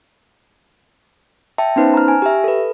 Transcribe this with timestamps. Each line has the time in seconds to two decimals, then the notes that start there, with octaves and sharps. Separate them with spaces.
1.58 E5 G5 A5
1.76 B3 C#4 D#4 B4 C5 A5
1.94 A#5 F6
2.08 G#5
2.22 G4 E5
2.44 A4 B4